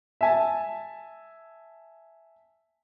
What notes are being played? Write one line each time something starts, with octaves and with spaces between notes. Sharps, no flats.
E5 G#5 A5